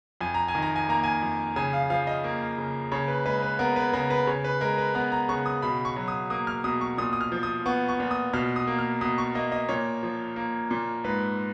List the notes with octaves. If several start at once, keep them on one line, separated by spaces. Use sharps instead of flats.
F2 G#5
A#5
G#5
D#3
A#5
G#5
A#3 A#5
G#5
F2
C#3 G#5
F5
F3 F5
D#5
A#3
C#3
C#3 C#5
B4
G#3 B4
B4
B3 A#4
B4
C#3 A#4
B4
C#3 C#5
B4
G#3 A#4
B4
B3 A#5
A#5
C#3 C#6
D#6
B2 B5
C#6
F#3
D#6
A#3 D#6
F6
B2 D#6
C#6
A#2 D#6
D#6
F6
F3
D#6
B3 C#6
C#6
A#2
D#6
B2 F6
D#6
A#3
F6
B2 D#6
C#6
A#3 D#5
D#5
A#2 C#5
F3
A#3
A#2
G#2 B4